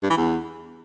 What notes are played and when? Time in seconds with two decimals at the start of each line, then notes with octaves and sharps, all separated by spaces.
0.03 G2
0.10 E3
0.17 E2